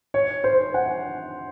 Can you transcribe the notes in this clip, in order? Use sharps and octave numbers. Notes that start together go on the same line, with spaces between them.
C#5
C5
F#5